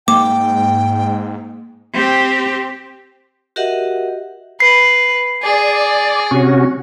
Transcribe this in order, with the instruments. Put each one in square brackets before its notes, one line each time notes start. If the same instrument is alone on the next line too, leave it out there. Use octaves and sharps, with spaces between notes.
[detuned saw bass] G#2 [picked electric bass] A#3 [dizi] G5 [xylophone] D6
[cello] C4 G4
[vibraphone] F#4 G4 A#4 D#5 E5 F#5
[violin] B4 [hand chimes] C7
[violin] G#4 [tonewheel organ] D5
[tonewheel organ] C3 C#4 F#4